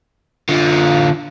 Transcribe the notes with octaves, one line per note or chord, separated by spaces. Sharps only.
D3 F4